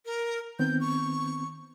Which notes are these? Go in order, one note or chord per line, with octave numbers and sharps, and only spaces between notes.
A#4
D#3 B3 C4 G6
C#6